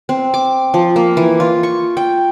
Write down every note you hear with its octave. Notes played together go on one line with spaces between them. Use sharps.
C4
D6
F3
A#3
E3
F4
C#6
G5